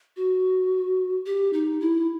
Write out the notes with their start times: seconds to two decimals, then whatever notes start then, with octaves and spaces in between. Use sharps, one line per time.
0.17 F#4
1.26 G4
1.53 D#4
1.81 E4